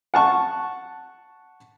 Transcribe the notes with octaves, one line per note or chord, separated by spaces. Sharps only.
F#5 A5 C#6